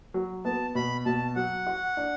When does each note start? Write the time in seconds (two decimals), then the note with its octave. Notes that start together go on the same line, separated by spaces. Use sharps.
0.14 F#3
0.45 B3 A5
0.75 B2 B5
1.06 B2 A5
1.36 F#3 F#5
1.67 F#4
1.97 D4